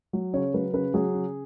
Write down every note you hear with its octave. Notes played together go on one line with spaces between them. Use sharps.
F#3
C#3 C#5
F#3 B4
C#3 B4
F#3 G#4
C#3